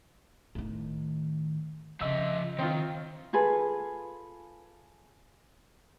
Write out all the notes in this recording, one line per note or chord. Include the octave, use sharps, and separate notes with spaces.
A2 D#3
C#3 F3 D#5 E5 E6
D#3 C4 F4 G5
F4 G#4 A4 B4